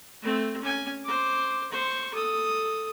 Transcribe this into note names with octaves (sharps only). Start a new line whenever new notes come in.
A3 C4
C#4 G#5
C5 D6
C5 C#6
A4 D#6